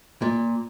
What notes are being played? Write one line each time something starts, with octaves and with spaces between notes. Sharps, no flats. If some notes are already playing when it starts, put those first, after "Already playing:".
A#2